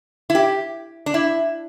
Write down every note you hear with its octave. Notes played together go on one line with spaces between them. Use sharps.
E4
G4
D4
E4